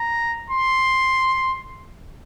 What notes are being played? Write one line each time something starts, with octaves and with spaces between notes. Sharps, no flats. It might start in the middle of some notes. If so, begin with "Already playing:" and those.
Already playing: A#5
C6